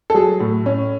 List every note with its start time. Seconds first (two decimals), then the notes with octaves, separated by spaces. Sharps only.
0.10 A4
0.14 F#3 G#4
0.40 A2
0.66 C#4